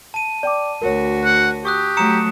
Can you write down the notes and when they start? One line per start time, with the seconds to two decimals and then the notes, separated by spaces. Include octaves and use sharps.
0.14 A5 D#7
0.43 D5 G5 D6
0.82 D2 F#4 A#4 C#5
1.24 F#5
1.65 G4 C#6 D#6 F#6
1.97 F#3 A3 A#5 D#6 C#7 E7